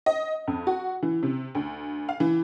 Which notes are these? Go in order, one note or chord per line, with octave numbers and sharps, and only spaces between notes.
D#5
F2
F#4
E3
C3
D2
F5
E3